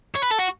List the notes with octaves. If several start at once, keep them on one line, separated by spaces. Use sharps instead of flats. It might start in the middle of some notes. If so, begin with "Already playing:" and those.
C#5
B4
A4
F#4